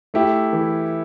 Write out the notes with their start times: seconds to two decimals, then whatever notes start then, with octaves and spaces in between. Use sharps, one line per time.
0.14 A3 E4 G4
0.53 E3